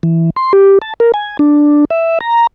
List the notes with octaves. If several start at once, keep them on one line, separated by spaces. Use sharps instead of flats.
E3
C6
G4
A5
A#4
G#5
D4
E5
A#5